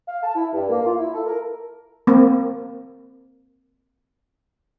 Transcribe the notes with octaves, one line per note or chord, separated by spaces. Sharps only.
F5
A5
E4
G2
A#3
F4
E4
A4
A#4
A#3 C4